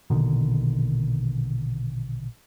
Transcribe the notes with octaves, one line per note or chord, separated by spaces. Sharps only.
A#1 B2 D3 D#3